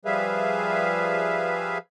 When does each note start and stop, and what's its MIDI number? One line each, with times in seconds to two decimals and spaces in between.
0.05 1.78 53
0.05 1.78 55
0.05 1.78 68
0.05 1.78 71
0.05 1.78 76
0.05 1.78 77